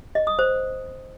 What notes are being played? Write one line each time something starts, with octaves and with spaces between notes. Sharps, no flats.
D#5
D#6
C5